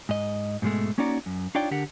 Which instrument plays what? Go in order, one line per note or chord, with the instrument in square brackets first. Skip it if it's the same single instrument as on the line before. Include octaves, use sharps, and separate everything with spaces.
[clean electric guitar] G#2 D#5
G#2 B2 F3 G#3 A3
A#3 C#4 D#4 F#4 D5 A#5
F#2
D4 D#4 F4 C#5 D5 G5
D3 D4 G4 A#4 F#5